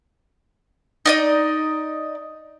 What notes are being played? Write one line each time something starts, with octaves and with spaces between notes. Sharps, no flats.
D#4 D5 D#5